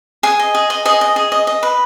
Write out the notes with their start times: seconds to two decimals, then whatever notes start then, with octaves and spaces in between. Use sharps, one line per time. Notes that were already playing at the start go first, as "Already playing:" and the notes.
0.23 G#4 G#5
0.39 D#5
0.55 G#4
0.70 D#5
0.85 G#4 D#5
1.01 D#5
1.16 G#4
1.32 D#5
1.47 D#5
1.63 B4